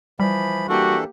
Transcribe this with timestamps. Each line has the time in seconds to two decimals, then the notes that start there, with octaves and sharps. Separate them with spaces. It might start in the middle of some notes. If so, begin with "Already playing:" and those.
0.20 E3 F3 G3 B5
0.69 E3 A#3 D4 F#4 G4 A4